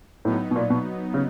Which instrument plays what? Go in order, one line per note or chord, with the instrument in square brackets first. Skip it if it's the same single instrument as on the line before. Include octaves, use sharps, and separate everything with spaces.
[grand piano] A2 [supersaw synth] F#3 B3 D#4
[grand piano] B2
A#2
B2
C#3